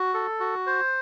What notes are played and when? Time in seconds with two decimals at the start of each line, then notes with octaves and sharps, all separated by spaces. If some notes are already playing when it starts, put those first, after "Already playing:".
Already playing: F#4
0.14 A4
0.40 F#4
0.67 C5